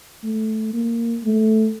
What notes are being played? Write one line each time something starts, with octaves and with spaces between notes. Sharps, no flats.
A3
A#3
A3